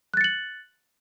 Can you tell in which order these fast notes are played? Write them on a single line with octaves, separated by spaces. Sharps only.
F#6 A6 C#7 F#7